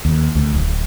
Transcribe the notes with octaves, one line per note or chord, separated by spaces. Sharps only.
D#2
D2
D1